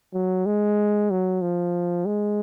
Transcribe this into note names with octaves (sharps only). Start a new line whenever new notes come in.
F#3
G#3
F#3
F3
G#3